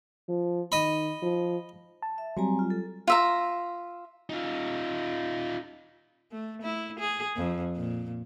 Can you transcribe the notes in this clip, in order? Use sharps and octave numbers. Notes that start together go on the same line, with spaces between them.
F3
D#3 D#5 B5
F3
A5
E5
F#3 G3 C4 G#5 A#5
F4
A4
F4 E5 A#5
D#4 F4
A3
E4
G#4
F2
A#2